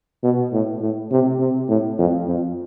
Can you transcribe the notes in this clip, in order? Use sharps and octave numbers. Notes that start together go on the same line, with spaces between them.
B2
A2
A2
C3
C3
A2
F2
F2